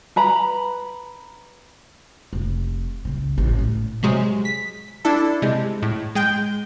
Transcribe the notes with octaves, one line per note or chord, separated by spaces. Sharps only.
B4 A#5 B5
F1
C#2 C#3
A1 F2
A2
C3 F#3 G#3
B6
D4 E4 A4
C3 G#3
A2
G#3 G5 G6